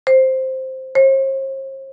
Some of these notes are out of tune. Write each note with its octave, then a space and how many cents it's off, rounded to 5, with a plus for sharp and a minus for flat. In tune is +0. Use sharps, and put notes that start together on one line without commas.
C5 +0
C5 +45